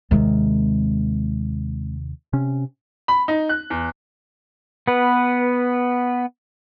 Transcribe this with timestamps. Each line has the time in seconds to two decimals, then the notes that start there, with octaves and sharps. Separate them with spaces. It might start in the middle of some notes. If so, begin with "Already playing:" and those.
0.11 D#2 C3 D#3 G#3 C4
2.33 C3 C#4
3.08 B5
3.28 D#4
3.49 F#6
3.70 E2
4.88 B3 B4